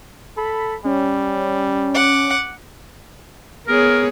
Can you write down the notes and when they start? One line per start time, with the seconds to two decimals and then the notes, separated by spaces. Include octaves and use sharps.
0.37 A4 B5
0.85 G3 C#4
1.94 F#5 D6
3.68 B3 G#4 A#4 C#5